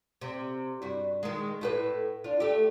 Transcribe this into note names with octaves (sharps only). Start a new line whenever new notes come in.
C3
G2 F#4
D#3 G#3
A2 F#4 B4
D4 F4
A3 G4